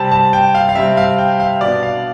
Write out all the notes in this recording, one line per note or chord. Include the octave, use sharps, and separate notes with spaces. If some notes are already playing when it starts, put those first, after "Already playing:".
Already playing: C3 G3 C4 A5
A5
G5
F5
F5
C3 G3 C4 E5
F5
G5
F5
B2 B3 D4 D5
F5